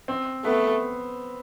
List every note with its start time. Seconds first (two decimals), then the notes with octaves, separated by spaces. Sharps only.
0.08 C4
0.44 A3 B3